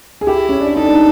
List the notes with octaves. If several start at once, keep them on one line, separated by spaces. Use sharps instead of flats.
G#4
E4 G4
C#4
D4
D#4 A4
D4
D#4